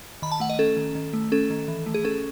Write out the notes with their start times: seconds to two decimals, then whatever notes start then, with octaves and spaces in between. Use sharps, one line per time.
0.22 D#3 B5
0.32 A5
0.40 A3 F#5
0.50 D#5
0.59 C#4 A4
0.77 D#3
0.95 D#3
1.13 A3
1.32 C#4 A4
1.50 D#3
1.68 E3
1.86 A3
1.94 G#4
2.04 C#4 A4